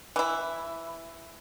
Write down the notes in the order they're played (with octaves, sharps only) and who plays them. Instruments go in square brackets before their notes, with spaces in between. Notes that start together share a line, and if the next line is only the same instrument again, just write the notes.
[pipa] E3 E4